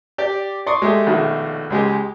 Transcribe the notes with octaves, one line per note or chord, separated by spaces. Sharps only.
G4 D5
D5 C6 C#6 D#6
G#3 A3 G4
A#1 B2 D#3 A3
C#2 G#3 G4